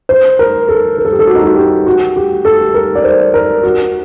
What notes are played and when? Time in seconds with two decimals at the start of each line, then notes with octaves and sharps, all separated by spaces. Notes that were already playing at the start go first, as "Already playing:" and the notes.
0.09 C5
0.39 A#4
0.69 A4
0.98 A#4
1.05 A4
1.12 G4
1.19 A4
1.27 F#4
1.35 D#4
1.43 F#4
1.56 G4
1.87 F#4
2.16 G4
2.45 A4
2.74 A#4
2.95 D5
3.04 C5
3.34 A#4
3.63 F#4